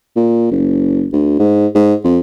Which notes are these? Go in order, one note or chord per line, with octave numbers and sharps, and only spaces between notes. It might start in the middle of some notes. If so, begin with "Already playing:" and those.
A#2
F#1
D2
G#2
G#2
F2